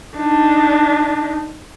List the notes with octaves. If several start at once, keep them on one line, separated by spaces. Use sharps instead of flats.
D4 D#4